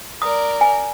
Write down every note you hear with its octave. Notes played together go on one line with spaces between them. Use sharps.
A#4 D5 D#6
G#5